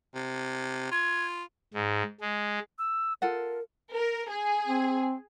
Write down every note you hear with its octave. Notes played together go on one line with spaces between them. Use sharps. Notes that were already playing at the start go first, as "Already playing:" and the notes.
C3
F4 G#6
G#2
G#3
E6
F4 A4 A#4 F#5
A#4
G#4
C4